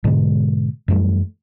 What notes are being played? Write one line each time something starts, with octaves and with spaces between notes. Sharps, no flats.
G#2 B2 D3 G#3
F#2 E3 G3 A3